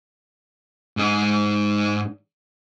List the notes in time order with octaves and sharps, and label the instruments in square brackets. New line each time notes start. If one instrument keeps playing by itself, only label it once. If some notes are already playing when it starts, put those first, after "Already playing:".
[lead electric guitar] G#2 D#4